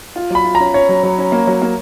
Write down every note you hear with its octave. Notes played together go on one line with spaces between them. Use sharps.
F4
F#3 B5
F4
C#4 A#5
C#4 C#5
F#3
F#3
C#4
A#3
F#3
A#3